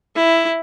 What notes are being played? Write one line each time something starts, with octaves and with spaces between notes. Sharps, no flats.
E4